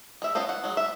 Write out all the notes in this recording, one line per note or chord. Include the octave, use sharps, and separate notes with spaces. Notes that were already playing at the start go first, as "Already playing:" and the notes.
G#3 E5
B3 C#4 F4 C5 D#5
F#5
F#3 G#3
B3 E5